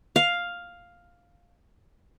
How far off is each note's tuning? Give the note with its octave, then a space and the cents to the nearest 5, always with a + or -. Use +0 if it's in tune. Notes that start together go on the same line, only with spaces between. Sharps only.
F5 +5